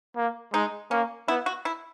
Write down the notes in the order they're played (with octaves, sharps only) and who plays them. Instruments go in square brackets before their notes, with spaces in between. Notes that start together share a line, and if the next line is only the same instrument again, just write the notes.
[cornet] A#3
[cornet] G#3 [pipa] D#4
[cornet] A#3 [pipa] C#4
[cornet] B3 [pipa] E4
[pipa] F#4
E4